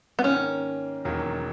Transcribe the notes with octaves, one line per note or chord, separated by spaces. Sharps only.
B3
G#2 D#3 A#3 C#4
E1 E2 D#3 F#3 A#3